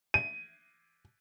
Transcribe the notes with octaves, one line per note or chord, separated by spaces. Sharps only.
D#7